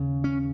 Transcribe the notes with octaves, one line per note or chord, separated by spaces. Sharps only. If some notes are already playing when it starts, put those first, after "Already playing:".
Already playing: D#2 C#3
C#4